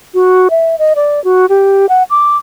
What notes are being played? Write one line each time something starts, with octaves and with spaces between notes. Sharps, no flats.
F#4
E5
D#5
D5
F#4
G4
F#5
D6